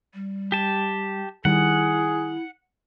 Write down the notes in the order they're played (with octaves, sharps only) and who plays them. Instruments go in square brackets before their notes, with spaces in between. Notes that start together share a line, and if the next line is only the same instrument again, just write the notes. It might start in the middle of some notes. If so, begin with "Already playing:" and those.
[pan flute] G3
[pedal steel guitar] G4 A5
[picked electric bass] D#3 G3 [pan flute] E4 [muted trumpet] G#4 [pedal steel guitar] F#5